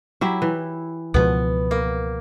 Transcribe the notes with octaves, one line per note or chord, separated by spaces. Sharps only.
F#3 E4 G4
E3
C#2 B2 F3 B3
A#3